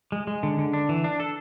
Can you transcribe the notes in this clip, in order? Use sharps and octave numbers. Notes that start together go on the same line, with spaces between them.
G#3
G#3
D3
D3
D4
E3
D4
A4